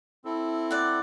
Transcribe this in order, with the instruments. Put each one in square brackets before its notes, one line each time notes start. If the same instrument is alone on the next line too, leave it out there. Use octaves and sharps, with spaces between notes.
[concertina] C4 E4 A4
[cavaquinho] D5 F#5